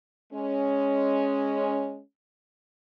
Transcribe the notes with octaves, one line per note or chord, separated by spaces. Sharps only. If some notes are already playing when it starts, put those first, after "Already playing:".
G#3 C#4